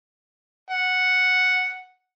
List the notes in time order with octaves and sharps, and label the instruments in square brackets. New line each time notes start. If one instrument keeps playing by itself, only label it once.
[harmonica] F#5